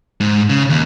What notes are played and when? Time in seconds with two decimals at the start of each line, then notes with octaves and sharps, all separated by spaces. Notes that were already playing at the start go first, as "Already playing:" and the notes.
0.20 G#2
0.50 C#3
0.70 D#2